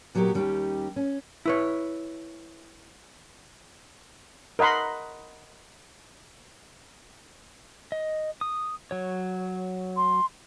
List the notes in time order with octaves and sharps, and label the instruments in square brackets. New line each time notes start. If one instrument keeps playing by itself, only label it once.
[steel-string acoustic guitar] A#2 F#3 B3 G4 A#4
D#2 G3 C#4 D#4 G4
C#4
[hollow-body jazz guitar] E4 B4 C#5
[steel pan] A#4 D#5 F#5 B5 C6
[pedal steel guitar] D#5
D#6
F#3 C#5
[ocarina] C6